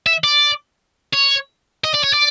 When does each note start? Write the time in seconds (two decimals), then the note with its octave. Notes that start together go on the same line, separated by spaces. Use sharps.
0.06 E5
0.24 D5
1.13 C#5
1.84 D#5
1.94 D5
2.04 C#5
2.14 D5